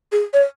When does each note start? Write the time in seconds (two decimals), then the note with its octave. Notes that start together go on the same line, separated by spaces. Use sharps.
0.12 G#4
0.34 C#5